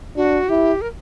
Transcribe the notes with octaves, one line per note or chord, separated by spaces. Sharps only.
D4 F#4
E4 G4
A#4